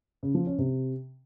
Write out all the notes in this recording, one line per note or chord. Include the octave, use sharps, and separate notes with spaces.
C#3
F3
C#4
C3